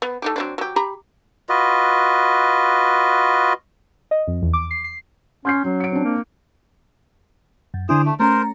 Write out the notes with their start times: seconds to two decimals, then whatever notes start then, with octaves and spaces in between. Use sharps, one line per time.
0.02 B3
0.22 A3 D#4 G4
0.36 F#3 C4 D4
0.58 F#3 G4
0.76 G4 A#5 B5
1.49 F4 F#4 B4 D#5
4.11 D#5
4.27 F2
4.42 E2
4.53 D6
4.71 C7
4.84 C7
5.45 C#4 C6 G6 C7
5.64 F#3 C#4
5.80 C#7 D7
5.92 C4 D4
6.04 A#3
7.74 F#2
7.89 D3 D4 E4 G#4 C5
8.05 A3
8.20 A3 C#4 A#4 C5 A#5